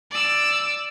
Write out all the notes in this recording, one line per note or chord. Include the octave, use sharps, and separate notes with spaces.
D5 E6